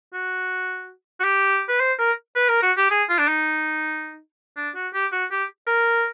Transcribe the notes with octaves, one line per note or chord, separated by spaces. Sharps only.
F#4
F#4
G4
B4
C5
A#4
B4
A#4
F#4
G4
G#4
F4
D4
D#4
D4
F#4
G4
F#4
G4
A#4